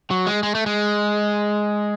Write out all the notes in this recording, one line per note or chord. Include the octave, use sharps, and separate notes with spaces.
F#3
G#3
G#3
A3
G#3